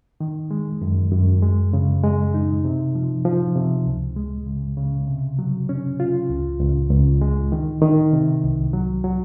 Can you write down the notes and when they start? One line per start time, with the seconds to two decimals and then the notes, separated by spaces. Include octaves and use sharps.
0.21 D#3
0.51 G#3
0.82 F#2
1.12 F#2
1.42 G#3
1.73 C#3
2.04 G#3
2.34 D#4
2.65 C3
2.95 F3
3.25 F3
3.56 C3
3.86 C#2
4.16 G#3
4.47 C#3
4.77 C#3
5.08 C3
5.39 F#3
5.69 C#4
6.00 F4
6.30 C#2
6.60 C#2
6.91 C#2
7.21 G#3
7.52 D#3
7.82 D#3
8.13 C3
8.44 C2
8.73 F#3
9.04 F#3